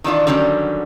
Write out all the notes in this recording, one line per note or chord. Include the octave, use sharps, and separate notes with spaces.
D#3 E3 D4 F4
D3 D#3 F#3 G3 C#4